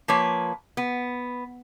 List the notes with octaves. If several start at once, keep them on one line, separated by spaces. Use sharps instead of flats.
F3 A#3 B4 C#5
B3